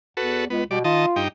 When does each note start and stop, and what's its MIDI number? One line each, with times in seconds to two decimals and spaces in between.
0.17 0.47 40
0.17 0.45 66
0.17 0.45 69
0.17 0.45 71
0.50 0.62 37
0.50 0.64 59
0.71 0.82 47
0.71 0.79 55
0.71 0.79 74
0.84 1.06 51
0.84 1.20 65
0.84 1.06 75
0.84 1.06 81
1.16 1.28 43
1.16 1.28 63
1.16 1.28 79